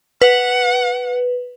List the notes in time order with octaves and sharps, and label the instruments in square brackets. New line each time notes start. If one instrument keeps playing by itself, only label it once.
[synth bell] B4 [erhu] F#5